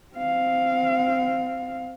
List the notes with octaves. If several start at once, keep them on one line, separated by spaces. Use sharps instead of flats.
C4 F5